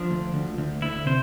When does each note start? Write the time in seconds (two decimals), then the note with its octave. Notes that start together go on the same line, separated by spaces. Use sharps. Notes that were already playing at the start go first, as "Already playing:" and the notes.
Already playing: F3 D4
0.11 D2
0.34 D2
0.58 D2
0.82 D2 E4
1.06 C3 C5